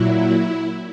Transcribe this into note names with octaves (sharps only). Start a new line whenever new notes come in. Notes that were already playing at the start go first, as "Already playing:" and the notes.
Already playing: A#2 F#3 E4